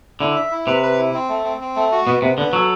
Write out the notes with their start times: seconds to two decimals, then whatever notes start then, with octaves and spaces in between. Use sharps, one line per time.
0.20 D3 E4
0.35 E5
0.51 E4
0.67 C3 B4
0.82 B4
0.98 E4
1.14 C4
1.29 A3
1.44 C4
1.61 C4
1.76 A3
1.92 F#4
2.06 B2 B3
2.22 C3 B3
2.38 D3 B3
2.53 F#3 A4